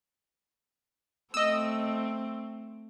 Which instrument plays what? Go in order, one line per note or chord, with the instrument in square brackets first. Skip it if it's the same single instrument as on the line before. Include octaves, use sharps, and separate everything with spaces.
[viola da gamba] A3 C4 [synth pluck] D#5 E6